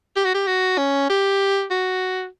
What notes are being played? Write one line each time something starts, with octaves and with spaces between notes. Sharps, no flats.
G4
F#4
G4
F#4
C#4
G4
F#4